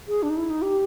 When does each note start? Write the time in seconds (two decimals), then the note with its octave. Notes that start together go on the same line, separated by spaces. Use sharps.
0.08 G#4
0.23 D4
0.30 D#4
0.37 E4
0.50 D#4
0.62 G4